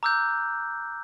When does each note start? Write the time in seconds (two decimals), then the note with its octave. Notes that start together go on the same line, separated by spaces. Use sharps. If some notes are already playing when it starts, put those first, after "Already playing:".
0.03 A#5 D6 E6 F#6 G6